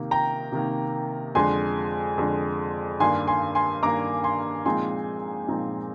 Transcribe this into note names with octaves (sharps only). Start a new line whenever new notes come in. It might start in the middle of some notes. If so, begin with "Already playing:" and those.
Already playing: C3 D#3 A#3
G5 A#5
C3 D#3 A#3
F2 D3 G#3 G#5 C6
F2 D3 G#3
G2 D#3 A#3 D4 G#5 C6
G#5 C6
G#5 C6
G2 D#3 A#3 D4 A#5 D6
G#5 C6
A#2 F3 G#3 C4 D#4 G#5 C6
A#2 F3 G#3 C4 D#4